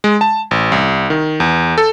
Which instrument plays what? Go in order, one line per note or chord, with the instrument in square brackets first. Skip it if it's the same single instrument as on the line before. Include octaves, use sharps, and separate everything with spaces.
[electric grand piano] G#3
A5
A1
C2
D#3
E2
A4